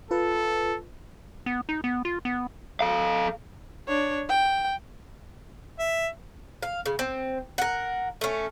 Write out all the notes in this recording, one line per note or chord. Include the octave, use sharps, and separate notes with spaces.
F4 A4 B4
B3
D#4
B3
F4
B3
A4 F5
D4 C#5
G5
E5
F5
C#3
C4
A#4 F#5
A3 C#4